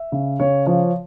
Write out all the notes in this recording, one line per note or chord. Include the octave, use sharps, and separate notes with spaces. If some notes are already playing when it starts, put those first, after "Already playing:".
Already playing: E5
C#3
C#3 C#5
F3 C#5